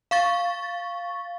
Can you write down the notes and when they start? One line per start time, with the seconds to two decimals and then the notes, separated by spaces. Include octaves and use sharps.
0.11 F5 C#6 A6